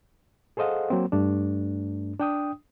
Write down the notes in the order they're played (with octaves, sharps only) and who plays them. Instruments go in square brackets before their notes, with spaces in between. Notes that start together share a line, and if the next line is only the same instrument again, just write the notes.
[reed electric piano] G#4 A4 C5 D#5 F5 F#5
F#3 A#3 C4
G2 A3 D4
D4 G5 D#6